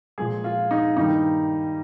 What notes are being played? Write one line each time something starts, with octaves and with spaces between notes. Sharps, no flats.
A#2 F3 G#3 G#4
F4
D#4
G2 D#3 G3 A#3 D#4